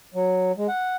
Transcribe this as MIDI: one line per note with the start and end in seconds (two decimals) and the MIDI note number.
0.14 0.52 54
0.57 0.67 56
0.68 0.96 78